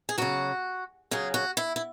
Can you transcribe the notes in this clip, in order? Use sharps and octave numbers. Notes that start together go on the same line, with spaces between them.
G#4
C#3 F#3 F#4
C#3 F#3 G#4
F#4
E4
E4